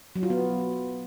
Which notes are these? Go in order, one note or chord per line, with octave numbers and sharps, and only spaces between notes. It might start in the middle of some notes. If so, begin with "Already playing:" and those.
F#3
F4
B3